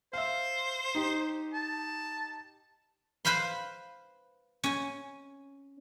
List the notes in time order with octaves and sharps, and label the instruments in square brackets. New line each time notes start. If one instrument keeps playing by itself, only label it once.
[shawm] C5 [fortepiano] E5 F5
[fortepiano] D#4 G4
[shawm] A5
[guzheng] B4 C5 F5 B5 C6
C#4 G#5